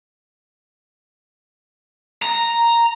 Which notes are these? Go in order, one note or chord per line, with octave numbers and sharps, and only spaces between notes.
A#5